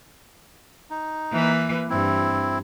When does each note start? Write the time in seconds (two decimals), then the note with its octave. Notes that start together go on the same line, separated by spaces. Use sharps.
0.90 D#4
1.32 E3 A#3 B4
1.90 G2 C4 E4